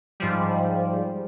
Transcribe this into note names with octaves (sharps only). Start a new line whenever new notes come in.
G#2 F3 G3